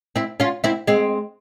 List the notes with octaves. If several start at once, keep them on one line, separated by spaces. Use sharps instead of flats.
C4 E4
C#4 F4
C4 E4
G#3 C4